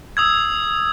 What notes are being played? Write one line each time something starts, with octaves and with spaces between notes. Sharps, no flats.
D#6 E6 G#6